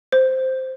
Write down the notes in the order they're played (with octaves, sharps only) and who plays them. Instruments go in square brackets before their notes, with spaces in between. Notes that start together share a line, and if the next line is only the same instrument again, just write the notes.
[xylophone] C5